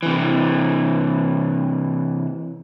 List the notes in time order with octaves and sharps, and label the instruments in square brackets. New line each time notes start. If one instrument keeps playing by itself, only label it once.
[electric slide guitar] C3 E3